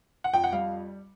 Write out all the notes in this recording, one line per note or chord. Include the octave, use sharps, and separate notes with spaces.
F#5
F2 G5
F#5
G3 F5